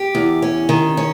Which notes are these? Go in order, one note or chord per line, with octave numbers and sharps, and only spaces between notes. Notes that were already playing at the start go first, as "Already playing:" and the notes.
Already playing: G4
E2
C#4
D#3
C#4